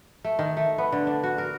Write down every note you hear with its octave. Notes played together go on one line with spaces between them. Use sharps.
A3
D#3
A3
B3
D3
D4
F#4
A#4